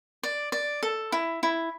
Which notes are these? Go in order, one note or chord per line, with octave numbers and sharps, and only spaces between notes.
D5
D5
A4
E4
E4